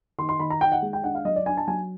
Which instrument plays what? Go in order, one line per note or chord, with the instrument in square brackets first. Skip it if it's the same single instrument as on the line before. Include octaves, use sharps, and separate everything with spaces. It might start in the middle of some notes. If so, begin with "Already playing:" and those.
[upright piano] D#3 C6
C6
D#3 B5
A#5
D#3 G5
F#5
G#3
G5
D4 F#5
F5
F#3 D#5
D5
D4 G#5
A5
F#3 G#5